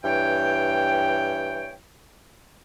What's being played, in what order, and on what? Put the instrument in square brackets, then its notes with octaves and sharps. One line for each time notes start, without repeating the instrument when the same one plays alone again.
[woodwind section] G2 E3 C#5 G5